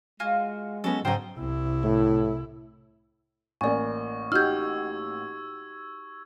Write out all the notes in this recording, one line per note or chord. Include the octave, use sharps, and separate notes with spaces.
G#3 F4 F#4 G#5
F#3 B3 C#4 F#4 A4
G#2 C#3 F#3 C#4 C5 D#5 G5
C2 E4
A2
A1 A#3 D5 G#5 C#6
D#4 F#4 G4 E6 F6 G6 G#6